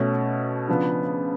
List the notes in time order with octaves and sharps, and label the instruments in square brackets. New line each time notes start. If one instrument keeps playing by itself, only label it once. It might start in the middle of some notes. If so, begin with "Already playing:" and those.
Already playing: [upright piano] B2 A3 C#4
C#3 F3 B3 D4